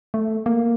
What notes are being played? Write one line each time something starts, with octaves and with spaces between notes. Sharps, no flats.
A3
A#3